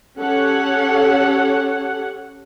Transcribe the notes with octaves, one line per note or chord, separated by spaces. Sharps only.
C#4 G4 A4 C#5 F#5